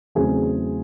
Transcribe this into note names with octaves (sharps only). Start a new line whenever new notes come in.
E2 C#3 F#3 A3 C4 G#4